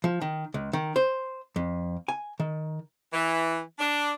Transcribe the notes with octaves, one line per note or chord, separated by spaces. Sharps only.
F3
D#3
C#2
D#3
C5
F2
G#5
D#3
E3
D4